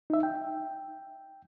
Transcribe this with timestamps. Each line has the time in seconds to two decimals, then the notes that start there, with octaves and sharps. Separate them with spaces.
0.10 D#4 E5
0.23 G5